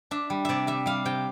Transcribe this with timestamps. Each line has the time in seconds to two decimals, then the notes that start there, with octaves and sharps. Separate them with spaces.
0.11 D4 E5
0.30 G3
0.45 C3 D5 E5
0.67 G3 E5
0.86 G3 F5
1.05 C3 G5